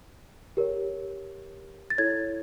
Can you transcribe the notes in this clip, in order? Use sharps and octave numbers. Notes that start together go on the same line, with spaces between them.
G4 A#4 C#5
A6
E4 A4 C#5 G#6